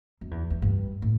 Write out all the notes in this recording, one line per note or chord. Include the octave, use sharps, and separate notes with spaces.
F#2
E2
E2
G2
A2